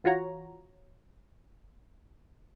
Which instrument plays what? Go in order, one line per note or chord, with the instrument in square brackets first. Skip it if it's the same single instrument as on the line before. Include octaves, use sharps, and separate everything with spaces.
[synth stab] E3 F4 F#4 C#5 A#5